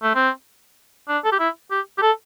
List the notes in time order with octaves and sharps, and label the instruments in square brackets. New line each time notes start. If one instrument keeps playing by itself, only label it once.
[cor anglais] A3
C4
D4
A4
G4
E4
G4
G4
A4